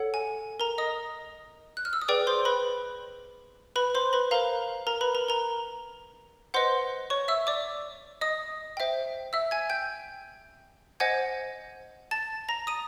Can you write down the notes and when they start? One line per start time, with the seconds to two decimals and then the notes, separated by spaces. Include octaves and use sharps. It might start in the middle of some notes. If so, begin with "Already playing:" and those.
Already playing: A4 C#5 F#5
0.14 G#5
0.60 A#4 A#5
0.78 D#5 D#6
1.77 F#6
1.85 F6
1.93 E6
2.02 D#6
2.08 G#4 B4 D5 G5 D6
2.27 C5 C6
2.45 B4 B5
3.76 B4 B5
3.95 C5 C6
4.13 B4 B5
4.31 A#4 C5 F5 A#5
4.87 A#4 A#5
5.01 B4 B5
5.15 A#4 A#5
5.29 A#4 A#5
6.54 B4 C5 D#5 F#5 C6
7.10 C#5 C#6
7.28 E5 E6
7.47 D5 D6
8.21 D#5 D#6
8.77 C5 E5 G5
9.33 E5 E6
9.51 G#5 G#6
9.70 G5 G6
11.00 C5 D#5 F#5 G#5 G#6
12.11 A5 A6
12.49 A#5 A#6
12.67 D#6 D#7